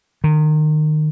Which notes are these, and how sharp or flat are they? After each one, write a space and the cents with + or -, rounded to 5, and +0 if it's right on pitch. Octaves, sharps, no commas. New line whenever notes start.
D#3 -25